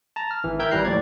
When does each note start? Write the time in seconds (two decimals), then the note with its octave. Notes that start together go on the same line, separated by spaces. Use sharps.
0.16 A5 A#5
0.31 F6
0.44 G#1 E3
0.59 A#4 E5 G5 E6 G6 G#6
0.71 G#1 E3 G3 A#5 F#6 C7
0.85 D#2 A2 F3 C#5 D5 G#6